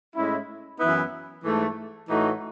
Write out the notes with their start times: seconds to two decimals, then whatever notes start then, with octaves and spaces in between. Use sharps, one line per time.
0.15 A2 G#3 C#4 E4
0.78 F#2 E3 B3 E4
1.44 G#2 E3 A3
2.09 A2 E3 A3 D#4 F#4